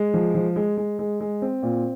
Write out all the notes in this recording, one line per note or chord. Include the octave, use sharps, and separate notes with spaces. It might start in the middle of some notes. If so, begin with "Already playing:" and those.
Already playing: G#3
F3
F3
G#3
G#3
G#3
G#3
C4
A#2